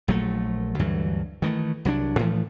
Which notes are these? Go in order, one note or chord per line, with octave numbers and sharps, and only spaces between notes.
A#1 F#3 A3
D2 G2 E3 F#3
D#3 E3 F#3 A3
C2 F#3 G3 D4
A2 E3 F3 A3